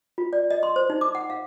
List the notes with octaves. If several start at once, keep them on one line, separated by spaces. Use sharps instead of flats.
F4
D5
D#5
C6
C5
D#4
D6
F#5
F5